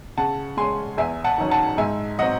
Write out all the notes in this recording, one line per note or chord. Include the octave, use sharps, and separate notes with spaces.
C#3 F#5 A5
G#3 C#4 G#5 C6
E2 E5 G#5
F#5 A5
D#3 F#3 C#4
F#5 A5
G#2 E5 G#5
F#3 C4 D#5 F#5